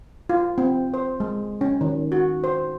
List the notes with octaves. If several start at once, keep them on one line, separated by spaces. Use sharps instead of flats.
F4
C4
C5
G#3
C#4
D#3
F#4
C5